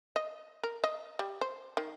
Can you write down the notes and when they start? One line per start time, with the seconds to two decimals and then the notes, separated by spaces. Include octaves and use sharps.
0.16 D#5
0.63 A#4
0.84 D#5
1.19 G3
1.41 C5
1.77 D#3